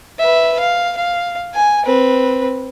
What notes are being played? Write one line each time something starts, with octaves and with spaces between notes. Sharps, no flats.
B4 E5
F5
F5
G#5
C4 B4